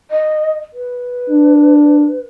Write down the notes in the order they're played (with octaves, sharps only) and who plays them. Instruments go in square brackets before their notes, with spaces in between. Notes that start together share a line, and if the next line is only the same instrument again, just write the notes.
[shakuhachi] D#5
B4
[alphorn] D4